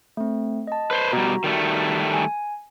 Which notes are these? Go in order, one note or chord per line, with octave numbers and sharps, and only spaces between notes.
A3 C4
D#5 A5
B4 C5
B2 G3 F#4 A#5
D#3 G3 A3
G#5